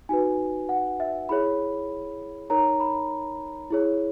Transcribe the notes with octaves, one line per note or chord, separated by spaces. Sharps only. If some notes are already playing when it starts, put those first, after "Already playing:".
D#4 F#4 B4 G#5
F#5
E5
E4 G#4 C#5 B5
D#4 A#4 C#5 A#5
B5
E4 G#4 C#5